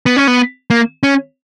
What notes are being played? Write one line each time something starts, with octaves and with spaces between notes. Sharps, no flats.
B3
C#4
B3
A#3
C#4